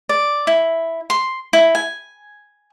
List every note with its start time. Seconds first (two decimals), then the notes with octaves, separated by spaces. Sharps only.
0.09 D5
0.47 E4
1.10 C6
1.53 E4
1.75 G#5